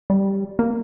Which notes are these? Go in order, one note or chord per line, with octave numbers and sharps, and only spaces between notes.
G3
A#3